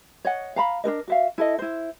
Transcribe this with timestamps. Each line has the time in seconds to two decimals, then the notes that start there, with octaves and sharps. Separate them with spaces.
0.25 C#5 D#5 F#5
0.56 F5 A#5 B5
0.84 D4 D#4 A#4 D#5
1.08 F#4 E5 F5
1.38 E4 A4 D#5
1.59 E4 C5